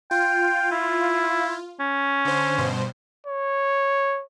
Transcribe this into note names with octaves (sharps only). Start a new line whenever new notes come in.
F4 G5
E4
C#4
D3 C5
G2 B2 C5
C#5